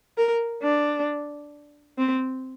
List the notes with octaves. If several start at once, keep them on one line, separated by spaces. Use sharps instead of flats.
A#4
D4
C4